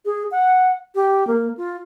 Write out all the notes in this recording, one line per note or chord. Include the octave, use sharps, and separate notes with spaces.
G#4
F#5
G4
A#3
F4